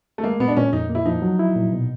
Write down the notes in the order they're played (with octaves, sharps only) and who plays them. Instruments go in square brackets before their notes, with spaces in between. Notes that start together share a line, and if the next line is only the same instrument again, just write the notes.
[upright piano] A3
[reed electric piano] G#3 [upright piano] A#3
[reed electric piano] A#2 [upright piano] B3
[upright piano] D4
[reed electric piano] A#2 [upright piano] C#4
[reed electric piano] F2 [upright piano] D#4
[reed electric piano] A#3
[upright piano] E4
[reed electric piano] F3 [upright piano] D#4
[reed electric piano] F#3
E4
A#2
B2